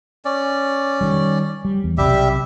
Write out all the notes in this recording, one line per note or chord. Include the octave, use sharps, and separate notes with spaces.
C#4 D5
D#3 G3
G3
E2
B1 C3 G3 G4 E5